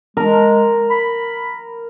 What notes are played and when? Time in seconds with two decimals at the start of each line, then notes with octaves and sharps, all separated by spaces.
0.17 G#3 A#4
0.90 B5